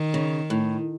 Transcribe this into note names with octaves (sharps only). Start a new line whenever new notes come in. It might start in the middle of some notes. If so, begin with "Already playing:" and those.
Already playing: D#3
C#3
A2